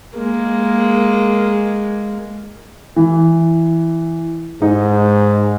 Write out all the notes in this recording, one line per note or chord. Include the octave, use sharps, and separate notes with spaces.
G#3 A#3
E3
G#2 D#4